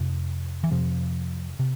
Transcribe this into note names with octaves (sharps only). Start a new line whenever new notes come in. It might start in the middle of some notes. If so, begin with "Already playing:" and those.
Already playing: F2 C3
E3
F2 C3 F3
C3